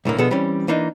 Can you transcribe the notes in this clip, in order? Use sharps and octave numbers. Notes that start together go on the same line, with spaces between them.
B1 A2 D3 A#3
B2 D3 F3 B3 G#4 A4
E3 G3 C4 C#4
E3 A#3 D4 D#4